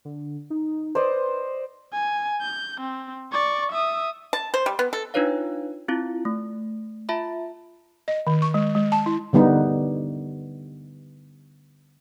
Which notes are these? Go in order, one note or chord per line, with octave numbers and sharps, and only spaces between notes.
D3
D#4
B4 C5 D5 D#5
G#5
G6
C4
D5 C#6
E5 D#6
A5
C5
G3
B3
A4
D4 D#4 F4 B4 C#5 F5
C4 E4 F4
A3
F4 E5 A5 B5
D#5
D#3
C#6
G#3
G#3
A5
E4
D3 G3 B3 D#4